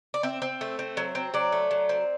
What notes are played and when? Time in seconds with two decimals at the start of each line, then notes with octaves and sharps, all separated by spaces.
0.14 D5
0.23 C4 E5
0.42 C4
0.61 A3
0.79 C4
0.97 F#3
1.15 C4
1.34 F#3 D5
1.52 A3
1.71 F#3
1.89 C4